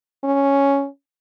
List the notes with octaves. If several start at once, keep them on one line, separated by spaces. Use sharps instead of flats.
C#4